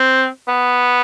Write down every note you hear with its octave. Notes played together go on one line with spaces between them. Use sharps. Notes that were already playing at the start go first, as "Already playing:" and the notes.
Already playing: C4
B3